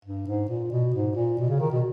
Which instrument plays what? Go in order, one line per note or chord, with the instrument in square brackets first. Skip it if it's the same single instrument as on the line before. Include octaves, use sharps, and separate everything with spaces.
[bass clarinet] G2
G#2
A#2
B2
G#2
A#2
B2
C#3
D#3
B2